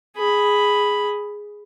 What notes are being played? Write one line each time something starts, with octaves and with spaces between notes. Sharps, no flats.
G#4 B5